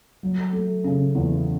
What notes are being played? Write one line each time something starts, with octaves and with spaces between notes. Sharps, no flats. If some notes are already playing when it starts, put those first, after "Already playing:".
F#3
A3
C#3
E2